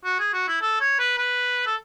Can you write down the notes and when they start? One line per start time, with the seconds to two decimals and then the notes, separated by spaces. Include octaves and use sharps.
0.05 F#4
0.19 G#4
0.33 F#4
0.48 E4
0.61 A4
0.81 C#5
0.99 B4
1.18 B4
1.66 A4